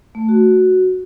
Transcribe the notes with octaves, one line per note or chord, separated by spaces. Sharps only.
A3
F#4